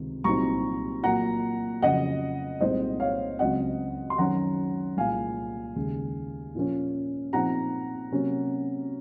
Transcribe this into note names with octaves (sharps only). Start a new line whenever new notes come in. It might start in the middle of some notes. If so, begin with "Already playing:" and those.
Already playing: C#2 C3 D#3
C2 A#2 F#3 C4 D#4 A#5 C#6
A#2 F#3 A#3 F#5 A#5
F2 C#3 F#3 D#5 F#5
C2 A#2 G#3 C4 D#4 C5 D#5
C#5 F5
C#2 C#3 F#3 C4 D#5 F#5
C6
F#2 D#3 F#3 C#4 F#5 A#5
C2 A#2 G#3 F5 G#5
D#2 C#3 G#3
A#2 F3 A#3 C#4
A#2 F3 C4 D#4 F#5 A#5
C3 F#3 A#3 C#4